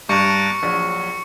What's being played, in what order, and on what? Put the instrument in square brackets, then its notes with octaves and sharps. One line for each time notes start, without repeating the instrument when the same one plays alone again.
[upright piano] G2 [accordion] A5 A#5 D6 [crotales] C#6 C#7
[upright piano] A#1 [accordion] F#3